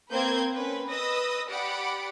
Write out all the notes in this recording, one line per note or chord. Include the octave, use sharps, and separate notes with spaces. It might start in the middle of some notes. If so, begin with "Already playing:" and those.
A#3 C4 B4 C5 G6 G#6
C#4 B4
B4 D#5 D#6 E6 A#6
G4 D5 F#5 B5 D7